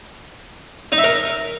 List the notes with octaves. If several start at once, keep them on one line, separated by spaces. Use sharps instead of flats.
D#4
E5
A#4